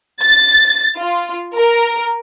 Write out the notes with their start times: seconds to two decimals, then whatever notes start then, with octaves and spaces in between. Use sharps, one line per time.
0.22 A6
0.96 F4
1.55 A#4